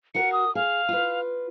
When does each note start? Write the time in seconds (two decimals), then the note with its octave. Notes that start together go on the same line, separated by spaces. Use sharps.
0.15 F#4 A#4 F5 C#7
0.32 D#6
0.55 G#4 F5
0.89 F4 B4